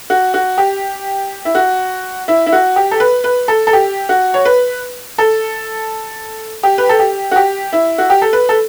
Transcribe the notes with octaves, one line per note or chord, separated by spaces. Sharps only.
F#4
F#4
G4
E4
F#4
E4
E4
F#4
G4
A4
B4
B4
A4
A4
G4
F#4
C#5
B4
A4
G4
B4
A4
G4
F#4
G4
E4
F#4
G4
A4
B4
A4